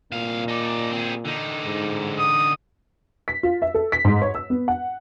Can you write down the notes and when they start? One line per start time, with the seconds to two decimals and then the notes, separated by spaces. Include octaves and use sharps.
0.12 C2 A#2 F5
0.48 D#4 D5
0.92 C4 G#4
1.25 D3 D#4
1.64 G#2
2.19 D#6
3.28 B6
3.43 F4
3.62 E5
3.74 A4
3.92 B6
4.05 G#2
4.22 C#5
4.35 E6
4.50 B3
4.68 F#5